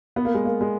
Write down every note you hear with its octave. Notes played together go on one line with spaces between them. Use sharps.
B3
A#3
G#3
A#3
G#3